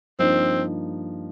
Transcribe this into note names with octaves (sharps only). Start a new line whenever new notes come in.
G2 F3 A#3 C4 D#4